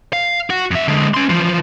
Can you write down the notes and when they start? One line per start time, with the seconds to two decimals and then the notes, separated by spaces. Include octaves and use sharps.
0.13 F5
0.50 F#4
0.71 F2 E5
0.88 D3 G#3
1.14 C#4 C6
1.29 E3 F3